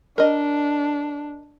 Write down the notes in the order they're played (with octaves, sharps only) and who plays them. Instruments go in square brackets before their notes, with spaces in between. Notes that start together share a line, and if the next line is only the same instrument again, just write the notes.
[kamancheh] D4 [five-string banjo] A#4 D#5